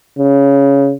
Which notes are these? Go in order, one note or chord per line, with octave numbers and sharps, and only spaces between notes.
C#3